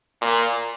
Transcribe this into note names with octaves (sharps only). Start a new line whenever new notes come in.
A#2